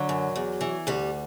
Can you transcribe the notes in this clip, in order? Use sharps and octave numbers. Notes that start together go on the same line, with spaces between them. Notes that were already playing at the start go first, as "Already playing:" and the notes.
Already playing: D3 F#3
F#2
E2
E3
D2 G3